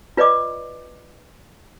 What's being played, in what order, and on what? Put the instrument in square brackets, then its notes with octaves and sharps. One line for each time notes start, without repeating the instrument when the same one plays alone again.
[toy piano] F4 B4 D5 D#5 D6